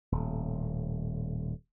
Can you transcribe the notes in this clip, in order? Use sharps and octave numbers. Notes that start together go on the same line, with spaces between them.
D#1 A2